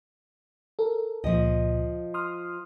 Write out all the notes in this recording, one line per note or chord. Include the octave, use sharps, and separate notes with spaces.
A4 A#4
C#2 A#2 F3 D#5
C6 D#6 F6